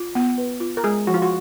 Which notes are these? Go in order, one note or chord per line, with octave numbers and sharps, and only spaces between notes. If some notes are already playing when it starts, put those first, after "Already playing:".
Already playing: F4
B3
B4
F4
A#4
G#3 G#4
F3 F#4
F4
F#4